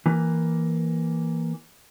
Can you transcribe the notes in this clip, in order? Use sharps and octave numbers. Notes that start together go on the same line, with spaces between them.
E3 A#3